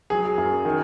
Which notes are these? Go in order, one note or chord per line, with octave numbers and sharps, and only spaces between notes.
F#3 G#4
F#2
D#3